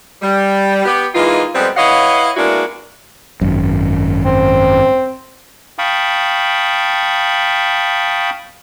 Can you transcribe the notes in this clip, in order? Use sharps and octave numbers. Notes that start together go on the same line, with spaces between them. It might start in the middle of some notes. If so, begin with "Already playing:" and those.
G3
B3 G4
E3 G#3 A#3 D#4 F4
F2 G3 G#3 B3 C4
E4 B4 C#5 D#5 F5 F#5
G#3 A#3 B3 D4 E4 F#4
G#1 F#2
C4
F5 G5 A5 B5 C#6 D#6